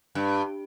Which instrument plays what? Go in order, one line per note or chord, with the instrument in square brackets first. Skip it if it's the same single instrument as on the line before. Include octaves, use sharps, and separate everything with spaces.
[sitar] G2